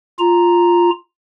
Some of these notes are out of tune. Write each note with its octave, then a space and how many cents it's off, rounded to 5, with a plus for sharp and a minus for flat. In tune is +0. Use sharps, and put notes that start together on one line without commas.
F4 +0 A#5 +0